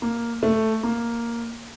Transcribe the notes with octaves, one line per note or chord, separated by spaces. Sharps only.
A#3
A3
A#3